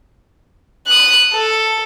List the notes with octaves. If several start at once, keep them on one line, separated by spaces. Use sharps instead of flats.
D#6 F#6
A4